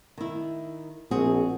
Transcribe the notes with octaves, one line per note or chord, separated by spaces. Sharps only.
D#3 E4
A#1 C4 F#4 G#4